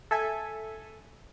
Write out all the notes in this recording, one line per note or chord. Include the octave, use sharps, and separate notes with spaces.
A4 E5 G#5